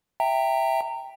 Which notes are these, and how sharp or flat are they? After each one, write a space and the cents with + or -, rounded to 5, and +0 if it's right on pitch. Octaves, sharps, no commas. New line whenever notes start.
E5 +0 G5 +5 A#5 -25